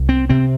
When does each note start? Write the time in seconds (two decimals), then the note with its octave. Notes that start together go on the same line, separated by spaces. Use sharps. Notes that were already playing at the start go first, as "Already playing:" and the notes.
Already playing: C2
0.09 C4
0.29 C3 C4